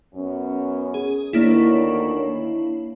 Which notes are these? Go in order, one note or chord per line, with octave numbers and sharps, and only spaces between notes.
F#2 B3 C#4
G#4
D2 D#3 A#3 D4 E4 C#5